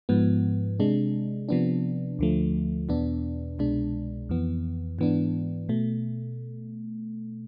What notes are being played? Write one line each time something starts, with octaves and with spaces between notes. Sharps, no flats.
G#2 F3 B3
C3 G#3 D4
C3 F3 B3 D4
D2 D3 F3 A3
E2 B2 B3 D4
C2 B2 G#3 D4
F2 E3 B3
G#2 E3 B3 D4
B2 A3